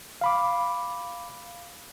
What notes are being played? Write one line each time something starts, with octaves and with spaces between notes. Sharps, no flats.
F5 B5 D6